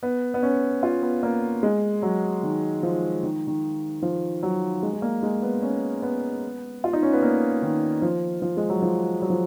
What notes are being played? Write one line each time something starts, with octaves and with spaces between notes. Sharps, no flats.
B3
B3
C#4
F4
B3
A#3
G#3
F#3
D#3
F3
D#3
D#3
F3
F#3
G#3
G#3
A#3
G#3
B3
C#4
B3
F4
D#4
C#4
B3
A#3
D#3
F3
F3
G#3
F#3
F3
F#3
F3